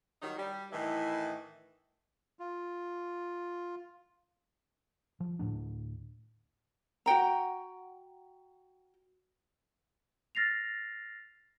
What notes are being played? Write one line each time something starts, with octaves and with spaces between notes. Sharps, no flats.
D#3 F#3 G3 D#4
G3
A2 D#3 E3
F4
F3
D2 A2 G3 D4
F#4 F#5 G5 A#5
F6 A6 A#6 C7 F7